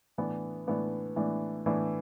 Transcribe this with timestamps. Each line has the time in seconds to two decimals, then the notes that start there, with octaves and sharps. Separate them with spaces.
0.18 A2 E3 B3 D4
0.67 A2 E3 B3 D4
1.16 A2 E3 B3 D4
1.66 A2 E3 B3 D4